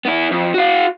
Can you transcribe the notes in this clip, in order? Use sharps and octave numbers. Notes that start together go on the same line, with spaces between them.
B3 E4
F2
F#4 F5